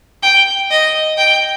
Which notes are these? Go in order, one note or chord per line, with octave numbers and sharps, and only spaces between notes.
G5
D#5
G5